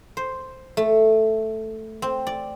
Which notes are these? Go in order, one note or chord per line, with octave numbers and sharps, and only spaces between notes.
C5
A3
C4
D5